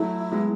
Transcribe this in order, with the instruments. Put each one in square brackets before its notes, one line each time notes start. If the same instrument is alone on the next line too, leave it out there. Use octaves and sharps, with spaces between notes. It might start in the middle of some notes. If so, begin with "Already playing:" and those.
Already playing: [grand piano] F#3 A3 [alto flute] E4
[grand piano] G#3 B3